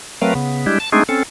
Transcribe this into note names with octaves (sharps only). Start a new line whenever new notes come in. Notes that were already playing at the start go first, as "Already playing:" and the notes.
F#3 A3 C4 A#4 B4 F5
C#3 B3
G3 G#3 D4 E4 G4
A5
G#3 A3 C4 D4 D#4 G#4
C4 C#4 A4